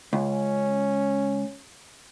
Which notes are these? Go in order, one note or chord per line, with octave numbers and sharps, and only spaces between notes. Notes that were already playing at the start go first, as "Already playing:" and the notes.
C#2 C#4